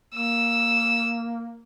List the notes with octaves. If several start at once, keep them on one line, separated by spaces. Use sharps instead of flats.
A#3 E6